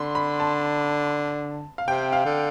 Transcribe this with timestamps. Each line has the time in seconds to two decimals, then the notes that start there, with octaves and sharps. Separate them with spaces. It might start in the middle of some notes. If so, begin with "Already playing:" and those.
Already playing: D3 B5 C6
0.15 B5
0.40 A5
1.78 F5
1.88 C3 G5
2.13 F5
2.25 D3